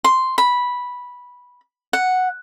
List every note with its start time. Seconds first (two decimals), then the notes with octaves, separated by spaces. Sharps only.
0.04 C6
0.38 B5
1.93 F#5